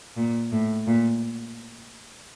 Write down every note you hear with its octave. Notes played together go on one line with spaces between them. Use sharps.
A#2
A2
A#2